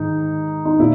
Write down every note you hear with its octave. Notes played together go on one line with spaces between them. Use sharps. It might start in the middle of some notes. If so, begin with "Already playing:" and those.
Already playing: G#2 D#3 D#4
D#4
A#2 E4